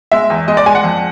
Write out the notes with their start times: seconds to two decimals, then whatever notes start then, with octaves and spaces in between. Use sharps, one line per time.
0.12 G#3 E5
0.30 E2
0.48 G#3 D#5
0.57 D5
0.66 G#3 G#5
0.75 F#5
0.84 F2